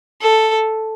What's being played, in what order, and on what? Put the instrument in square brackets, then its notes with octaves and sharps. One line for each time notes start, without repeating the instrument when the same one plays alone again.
[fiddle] A4